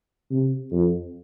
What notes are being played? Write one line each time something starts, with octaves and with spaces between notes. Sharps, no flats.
C3
F2